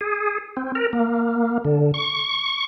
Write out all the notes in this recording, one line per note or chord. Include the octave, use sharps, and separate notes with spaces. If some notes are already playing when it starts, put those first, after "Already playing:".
G#4
C4
A#4
A#3
D3
C#6